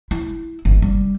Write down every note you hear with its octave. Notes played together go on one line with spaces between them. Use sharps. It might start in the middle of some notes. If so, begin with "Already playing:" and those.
E4
G1
G3